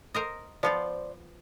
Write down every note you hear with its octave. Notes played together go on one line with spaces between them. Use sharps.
A#4 C5 D#5
F3 B3 F4 C5 D5